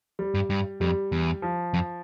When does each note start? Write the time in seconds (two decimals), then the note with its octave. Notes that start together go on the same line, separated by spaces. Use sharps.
0.19 G3
0.34 G2
0.50 G2
0.81 F2 G3
1.12 E2
1.42 F3
1.74 F2